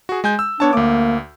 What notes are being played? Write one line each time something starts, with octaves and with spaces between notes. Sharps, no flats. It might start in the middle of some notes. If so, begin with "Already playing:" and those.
F#4 G#4
G#3 G#5 G6
E6
B3 D4 C#5 A5
D2 A#3 D6